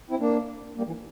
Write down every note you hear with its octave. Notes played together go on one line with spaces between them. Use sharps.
C4 E4
A#3 D4
G3 A#3
E3